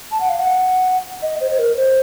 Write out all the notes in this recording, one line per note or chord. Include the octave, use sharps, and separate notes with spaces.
A5
F#5
F5
F#5
D#5
C5
C5
A#4
C5